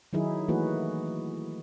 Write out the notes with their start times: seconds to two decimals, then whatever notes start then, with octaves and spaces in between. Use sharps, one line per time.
0.13 D#3 F#3 D#4 E4 G#4
0.48 E3 A3 A#3 F#4 G#4 B4